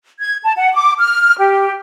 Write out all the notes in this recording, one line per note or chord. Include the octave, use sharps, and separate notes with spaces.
G#6
A5
F#5
D6
F6
G4